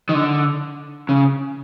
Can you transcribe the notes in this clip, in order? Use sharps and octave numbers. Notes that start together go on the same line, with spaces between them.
D#3
D3
C#3